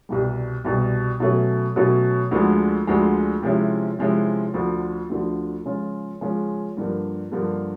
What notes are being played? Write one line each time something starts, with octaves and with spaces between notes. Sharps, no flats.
C2 B2 G3
C2 B2 G3
B2 F#3 A3 C#4 F#4
B2 F#3 A3 C#4 F#4
D2 D3 F3 G#3
D2 D3 F3 G#3
C3 F3 G#3 C#4 E4
C3 F3 G#3 C#4 E4
D2 D3 F3
D2 D3 F3
C#3 F3 G#3 C#4 F4
C#3 F3 G#3 C#4 F4
G2 D3 F3 A#3
G2 D3 F3 A#3